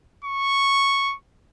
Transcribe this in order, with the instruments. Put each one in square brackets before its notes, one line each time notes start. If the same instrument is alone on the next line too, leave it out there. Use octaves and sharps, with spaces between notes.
[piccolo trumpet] C#6